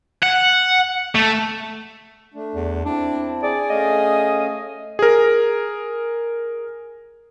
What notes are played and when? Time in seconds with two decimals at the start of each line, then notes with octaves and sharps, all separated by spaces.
0.23 F#5
1.15 A3
2.34 A3 D4
2.55 E2
2.85 C4 D4 E4
3.43 G#4 D5
3.70 A3 C#4 D#5 F5
4.99 G#4 A#4